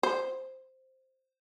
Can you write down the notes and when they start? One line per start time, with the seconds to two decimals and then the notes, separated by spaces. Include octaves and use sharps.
0.03 C5